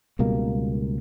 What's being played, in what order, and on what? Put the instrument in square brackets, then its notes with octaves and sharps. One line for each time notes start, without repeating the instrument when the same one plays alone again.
[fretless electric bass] C#2 B2 G3 A#3